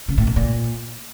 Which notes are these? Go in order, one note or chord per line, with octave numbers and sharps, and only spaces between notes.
C#3
A2
B2
A#2